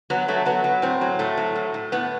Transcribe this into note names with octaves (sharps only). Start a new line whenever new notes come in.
F#3 B3
F#3 A3
F#3 B3
F#3
A2 C4
F#3
A2 A3
F#3
A2
A2
A2 B3